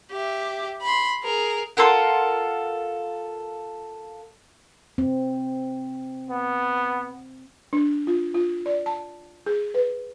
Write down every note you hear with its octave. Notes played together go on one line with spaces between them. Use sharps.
G4 E5
B5 C6
G#4 A#4
F4 A4 A#4 F#5
C4
B3
D4
F4
F4
D5
A5
G#4
B4